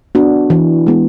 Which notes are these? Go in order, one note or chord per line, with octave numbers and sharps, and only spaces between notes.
B3 D4 F#4
E3
G#3 B3